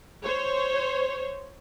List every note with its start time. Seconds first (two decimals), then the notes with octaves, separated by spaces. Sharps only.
0.22 C5 C#5